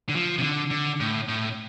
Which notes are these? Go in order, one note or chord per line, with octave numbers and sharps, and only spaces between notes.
D3
F3
C3
D3
D3
A2
A2